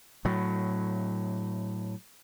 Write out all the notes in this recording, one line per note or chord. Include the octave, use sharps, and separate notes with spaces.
A2 F#3